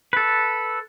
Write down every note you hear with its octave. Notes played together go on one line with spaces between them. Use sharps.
A4 B4